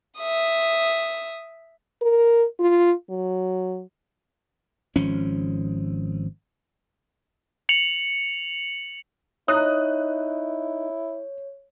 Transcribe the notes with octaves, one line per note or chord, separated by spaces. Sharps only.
E5 D#6
A#4
F4
F#3
G#1 F3 C#4
C#7 F7 F#7
D#4 E4 C#5 D#6 F#6